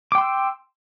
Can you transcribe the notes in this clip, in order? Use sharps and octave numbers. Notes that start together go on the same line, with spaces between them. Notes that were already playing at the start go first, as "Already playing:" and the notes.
G5 C6 D6 E6